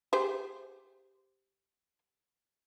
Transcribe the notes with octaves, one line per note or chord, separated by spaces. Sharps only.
G4 G#4 C5